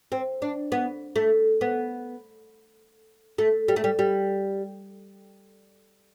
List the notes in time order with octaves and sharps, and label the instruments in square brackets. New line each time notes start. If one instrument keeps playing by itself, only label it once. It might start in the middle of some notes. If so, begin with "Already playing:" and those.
[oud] C4
D4
B3
A3
B3
A3
G3
A3
G3
G3